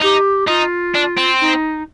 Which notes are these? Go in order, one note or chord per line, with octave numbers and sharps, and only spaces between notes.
D#4 G4
D#4 F4
D4
C4
D#4